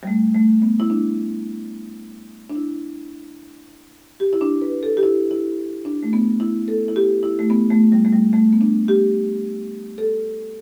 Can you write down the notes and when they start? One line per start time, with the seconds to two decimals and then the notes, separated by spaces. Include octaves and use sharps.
0.03 G3
0.07 A3
0.34 A3
0.62 B3
0.80 E4
0.90 D4
2.50 D4
2.56 E4
4.20 G4
4.33 E4
4.41 D4
4.62 B4
4.83 A4
4.97 G4
5.03 E4
5.31 E4
5.85 D4
6.03 A3
6.13 B3
6.40 E4
6.68 A4
6.88 E4
6.96 G4
7.23 E4
7.39 A3
7.50 B3
7.71 A3
7.92 G3
8.05 A3
8.13 G3
8.33 A3
8.53 B3
8.61 D4
8.88 G4
9.98 A4